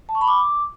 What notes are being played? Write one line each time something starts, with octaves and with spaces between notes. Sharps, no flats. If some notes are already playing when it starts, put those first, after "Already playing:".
A5
C#6
B5
D6